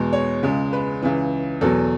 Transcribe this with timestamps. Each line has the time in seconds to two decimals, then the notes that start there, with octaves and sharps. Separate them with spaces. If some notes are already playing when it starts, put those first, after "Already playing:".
Already playing: E2 B2 G#3
0.13 C#5
0.43 C#2 C#3 G#3
0.73 B4
1.02 C#2 C#3 E3
1.61 E2 B2 F#3 A4